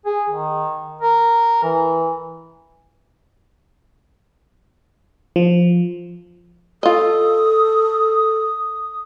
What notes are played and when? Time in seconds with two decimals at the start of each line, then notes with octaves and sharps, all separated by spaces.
0.06 G#4
0.30 D#3
1.01 A#4
1.63 E3
5.36 F3
6.83 F4 A4 D#5 D#6